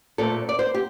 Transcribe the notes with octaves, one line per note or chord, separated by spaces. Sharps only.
A#2 A3 C4 A4
D5
C5
G4